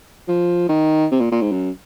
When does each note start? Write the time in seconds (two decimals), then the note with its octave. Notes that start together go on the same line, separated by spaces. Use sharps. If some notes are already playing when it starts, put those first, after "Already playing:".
0.28 F3
0.69 D#3
1.11 C3
1.21 A#2
1.32 A#2
1.41 G#2
1.52 F#2